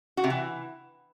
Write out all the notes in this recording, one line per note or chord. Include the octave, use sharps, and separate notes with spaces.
F#4
C3
E3